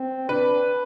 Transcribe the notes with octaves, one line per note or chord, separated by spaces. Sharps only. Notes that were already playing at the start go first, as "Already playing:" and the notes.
Already playing: C4
D4 B4